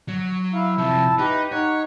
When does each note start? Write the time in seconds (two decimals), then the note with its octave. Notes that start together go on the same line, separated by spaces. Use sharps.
0.08 F#3
0.53 E4 E5 F5
0.78 C3 F3 E5 A5
1.18 D#4 G4 B4
1.52 D#4 C#5 F#5